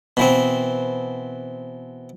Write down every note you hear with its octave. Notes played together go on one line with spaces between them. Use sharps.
B2 E3 C4